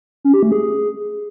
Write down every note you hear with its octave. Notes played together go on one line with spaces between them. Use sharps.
C#4
G4
A3
G#4